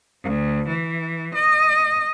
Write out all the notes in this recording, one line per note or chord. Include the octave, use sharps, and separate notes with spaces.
D2
E3
D#5